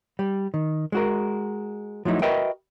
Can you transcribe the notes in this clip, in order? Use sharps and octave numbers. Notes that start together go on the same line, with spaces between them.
G3
D#3
G#3 F#4 A#4
F3 F#3 A3 D#4 E4
F#4 A#4 B4 D#5 E5 G5